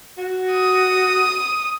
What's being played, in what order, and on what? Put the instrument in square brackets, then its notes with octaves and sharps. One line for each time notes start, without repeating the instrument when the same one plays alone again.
[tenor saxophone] F#4
[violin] D#6